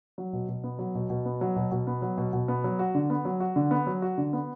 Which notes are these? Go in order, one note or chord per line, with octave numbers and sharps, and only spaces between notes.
F#3
B2
B2
B3
F#3
B2
B2
B3
F#3
B2
B2
B3
F#3
B2
B2
B3
F#3
F#4
D3
B3
F#3
F#4
D3
B3
F#3
F#4
D3
B3